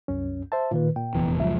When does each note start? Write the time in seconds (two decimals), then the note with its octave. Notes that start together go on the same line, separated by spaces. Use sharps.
0.08 C2 F#2 C#4
0.52 C5 E5 A5
0.71 A#2 D#3 A#3 F4 B4
0.96 A#2 G5
1.15 F1 E2 E3
1.40 C#2 F#2 F3 E5